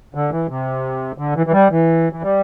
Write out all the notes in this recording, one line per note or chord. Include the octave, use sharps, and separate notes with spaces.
D3
E3
C3
D3
E3
E3
G3
E3
E3
G3